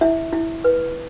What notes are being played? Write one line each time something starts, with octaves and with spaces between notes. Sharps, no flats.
E4 E5
E4
B4